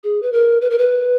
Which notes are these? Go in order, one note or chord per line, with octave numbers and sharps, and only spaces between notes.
G#4
B4
A#4
B4
A#4
B4